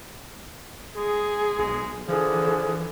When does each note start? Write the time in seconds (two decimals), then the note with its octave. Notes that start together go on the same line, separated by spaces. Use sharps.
0.96 G#3 G#4
1.59 B1 G#3
2.08 D3 E3 F3 G#4